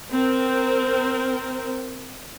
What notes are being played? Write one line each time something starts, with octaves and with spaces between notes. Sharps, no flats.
C4 A#4